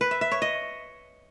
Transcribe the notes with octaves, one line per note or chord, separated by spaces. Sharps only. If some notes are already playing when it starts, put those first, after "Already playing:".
B4
E5
E5
C#5
D#5